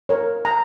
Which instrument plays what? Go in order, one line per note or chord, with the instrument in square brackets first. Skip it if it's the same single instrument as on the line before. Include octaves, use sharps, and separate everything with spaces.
[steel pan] A#4 C#5
A#5